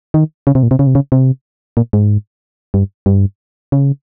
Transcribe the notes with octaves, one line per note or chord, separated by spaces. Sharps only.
D#3
C#3
C3
A#2
C3
C#3
C3
C#3
C3
A#2
G#2
G2
G2
C#3